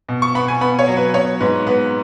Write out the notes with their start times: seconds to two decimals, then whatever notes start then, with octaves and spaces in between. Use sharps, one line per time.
0.09 B2
0.22 C#6
0.35 B3 B5
0.48 G#5
0.61 B3 B5
0.79 C#5
0.87 F#3
0.97 B4
1.14 B3 C#5
1.40 G#2 B4
1.67 B3 B4